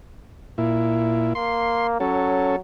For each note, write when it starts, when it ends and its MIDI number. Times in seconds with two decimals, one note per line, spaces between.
0.58 1.33 46
0.58 1.33 64
1.35 1.97 58
1.35 1.87 84
2.00 2.59 54
2.00 2.56 61
2.00 2.56 69